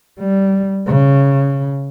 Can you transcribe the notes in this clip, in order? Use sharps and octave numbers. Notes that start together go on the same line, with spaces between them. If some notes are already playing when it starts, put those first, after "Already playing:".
G3
C#3